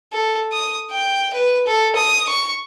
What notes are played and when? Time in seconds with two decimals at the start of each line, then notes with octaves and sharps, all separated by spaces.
0.13 A4
0.53 D#6
0.91 G5
1.34 B4
1.67 A4
1.96 D#6
2.29 C#6